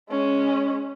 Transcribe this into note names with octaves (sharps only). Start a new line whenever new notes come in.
G#3 C#4